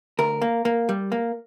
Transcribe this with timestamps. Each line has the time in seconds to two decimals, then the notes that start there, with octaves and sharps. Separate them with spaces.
0.19 D2 A#4
0.42 A#3
0.65 A#3
0.89 G3
1.12 A#3